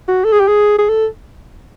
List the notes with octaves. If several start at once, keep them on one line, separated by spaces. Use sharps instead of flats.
F#4
A4
G#4
G4
G#4
G#4
A4